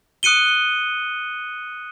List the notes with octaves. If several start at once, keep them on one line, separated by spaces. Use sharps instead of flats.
D#6 F#6 C#7 D#7 G7